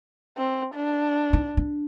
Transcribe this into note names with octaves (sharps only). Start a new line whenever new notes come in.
C4
D4
D#4
D4